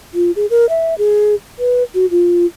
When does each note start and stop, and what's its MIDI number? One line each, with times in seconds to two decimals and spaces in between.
0.14 0.31 65
0.36 0.46 68
0.50 0.66 70
0.69 0.95 76
0.98 1.35 68
1.59 1.83 71
1.94 2.06 66
2.11 2.46 65